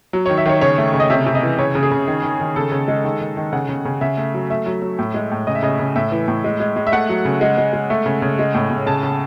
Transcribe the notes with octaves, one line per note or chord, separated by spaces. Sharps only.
F#3
D#3 C#5
E5
D#3 C#5
C#3 C#5
A3
C#3
D#5
C3 E5
C3
D#5
E3
C#3 C#5
C#3
G#4
C#3
D#3
D#3
D#3
C#3 A4
C#3
G#3
D#3
D#3
D#3
C#3 F#5
C#3
C#3
C#3 E5
A3
F#3
A3 E5
F#3
F#3
A2
G#3
A2
C#3 D#5
E5
C#3 D#5
C#3
A2 E5
E3
A2
G#3
G#3
G#3
E5
A3 F#5
F#3
C#3
G#3
G#3
G#3
A3
C#3
C#3
G#3
A2
A2
C#3 A5
C#3